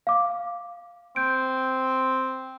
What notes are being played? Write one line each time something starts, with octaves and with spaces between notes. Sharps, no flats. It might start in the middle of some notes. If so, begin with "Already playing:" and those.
F5 D6
C4 G6 D7